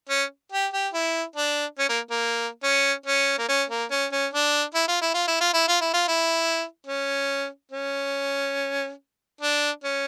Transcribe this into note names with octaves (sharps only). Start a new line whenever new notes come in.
C#4
G4
G4
E4
D4
C#4
A#3
A#3
C#4
C#4
A#3
C#4
A#3
C#4
C#4
D4
E4
F4
E4
F4
E4
F4
E4
F4
E4
F4
E4
C#4
C#4
D4
C#4